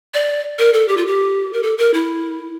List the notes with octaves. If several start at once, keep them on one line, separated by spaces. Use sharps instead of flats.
D5
A#4
A4
G4
F4
G4
A#4
A4
A#4
E4